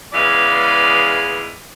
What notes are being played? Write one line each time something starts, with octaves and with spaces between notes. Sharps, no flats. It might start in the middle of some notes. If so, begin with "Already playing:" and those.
C#3 E3 G#3 B3 D5 F5